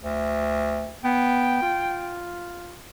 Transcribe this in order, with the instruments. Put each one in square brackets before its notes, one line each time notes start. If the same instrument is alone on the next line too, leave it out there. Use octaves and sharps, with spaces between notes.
[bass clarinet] D2
[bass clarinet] B3 [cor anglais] G5
[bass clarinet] F4